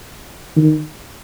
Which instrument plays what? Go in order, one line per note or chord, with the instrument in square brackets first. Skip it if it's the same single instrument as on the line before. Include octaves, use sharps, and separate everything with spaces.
[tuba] D#3